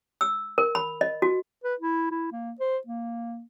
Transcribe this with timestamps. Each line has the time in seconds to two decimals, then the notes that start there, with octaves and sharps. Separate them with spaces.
0.21 E6
0.58 A#4
0.75 B5
1.01 D#5
1.22 F#4
1.64 B4
1.80 E4
2.11 E4
2.32 A#3
2.60 C5
2.87 A#3